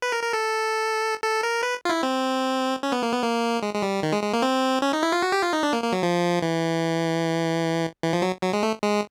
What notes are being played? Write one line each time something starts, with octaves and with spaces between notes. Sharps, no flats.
B4
A#4
A#4
A4
A4
A#4
B4
F4
E4
C4
C#4
B3
A#3
B3
A#3
G#3
G#3
G3
D#3
G#3
G#3
A#3
C4
C#4
D#4
E4
F4
F#4
G4
F4
D#4
D4
A#3
A#3
F#3
F3
E3
E3
F3
F#3
F#3
G#3
A3
G#3